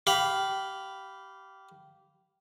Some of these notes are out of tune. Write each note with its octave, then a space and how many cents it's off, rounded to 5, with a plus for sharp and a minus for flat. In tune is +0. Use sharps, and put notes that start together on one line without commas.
G4 -20 F5 +0 B5 +0